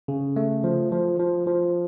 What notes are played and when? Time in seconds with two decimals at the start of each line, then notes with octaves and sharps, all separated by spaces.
0.08 C#3
0.36 A3
0.64 F3
0.92 F3
1.19 F3
1.47 F3